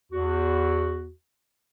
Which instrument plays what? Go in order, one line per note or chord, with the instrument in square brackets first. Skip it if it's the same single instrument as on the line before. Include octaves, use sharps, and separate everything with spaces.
[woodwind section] E2 F#4